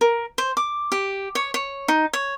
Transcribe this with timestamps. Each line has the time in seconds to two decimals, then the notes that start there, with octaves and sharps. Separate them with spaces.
0.01 A#4
0.38 C5
0.57 D6
0.92 G4
1.35 C#5
1.54 C#5
1.88 D#4
2.13 C#5